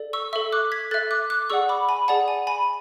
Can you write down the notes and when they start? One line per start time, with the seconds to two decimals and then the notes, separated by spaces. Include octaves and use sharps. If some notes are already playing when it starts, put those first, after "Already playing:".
Already playing: A4 D5
0.13 C#6 E6
0.33 A4 E5 C#6 E6
0.52 D6 F#6
0.72 G#6 B6
0.91 A4 E5 F#6 A6
1.11 D6 F#6
1.30 D6 F#6
1.50 G#4 D5 F#5 C#6 E6
1.69 B5 D6
1.89 G#5 B5
2.08 G#4 D5 F#5 A5
2.28 G#5
2.47 G#5 B5